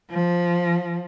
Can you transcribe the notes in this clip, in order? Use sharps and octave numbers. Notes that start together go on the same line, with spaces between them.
F3